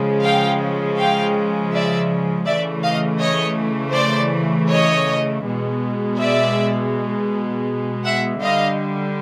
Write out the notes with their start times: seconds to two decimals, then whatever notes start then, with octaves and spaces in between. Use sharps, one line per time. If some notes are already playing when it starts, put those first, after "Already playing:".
Already playing: C#3 F3 G#3
0.23 F5 G5
0.97 F5 G5
1.72 D5 E5
2.46 C#3 E3 A3 D5 E5
2.83 D#5 F5
3.20 C#5 D#5
3.95 C5 D5
4.69 C#5 D#5
5.43 B2 G#3
6.18 D5 E5
8.04 E5 F#5
8.41 D3 G3 D#5 F5